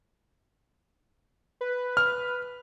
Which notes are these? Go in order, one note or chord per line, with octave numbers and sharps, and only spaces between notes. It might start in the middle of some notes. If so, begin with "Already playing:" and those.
B4
F6